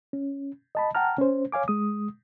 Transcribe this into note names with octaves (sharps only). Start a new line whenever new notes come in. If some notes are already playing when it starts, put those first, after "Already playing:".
C#4
D#5 A5 B5
F#5 G5 A5 A#5 F6
C#4 C5
C#5 F5 G#5 D6
G#3 D#6